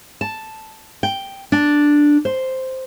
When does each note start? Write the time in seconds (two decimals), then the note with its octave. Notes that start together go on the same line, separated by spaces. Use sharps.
0.21 A5
1.03 G5
1.52 D4
2.25 C5